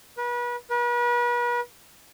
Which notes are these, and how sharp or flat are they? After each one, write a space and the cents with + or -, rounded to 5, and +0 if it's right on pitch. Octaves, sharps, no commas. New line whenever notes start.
B4 -35
B4 -40